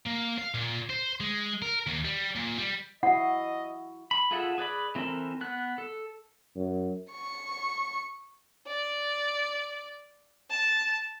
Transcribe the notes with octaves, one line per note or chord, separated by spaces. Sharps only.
A#3
F5
A#2
C5
G#3
A#4
D#2
G3
A#2
G3
E4 F#4 D#5 F#5
B5
F4 G#4 A4 E5 F#5
G#4 B4 D5 B5
E3 C4 E4 A4 A#4
B3 F#6
A4
F#2
C#6
D5
A5